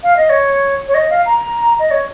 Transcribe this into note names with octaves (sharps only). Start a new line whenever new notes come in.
F5
D#5
C#5
C#5
D#5
F5
A#5
D#5
C#5